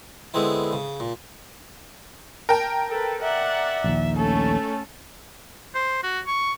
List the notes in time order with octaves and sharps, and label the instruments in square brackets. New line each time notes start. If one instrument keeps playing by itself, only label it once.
[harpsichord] D3 G#3 B3 C4 E4
C#3
A#2
[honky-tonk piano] A#4 G5 A5
[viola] A4 B4
[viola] D5 F#5 [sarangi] E5
[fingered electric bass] A#1 D#2
[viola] A3 C#4 [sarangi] A4
[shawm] C5
F#4
C#6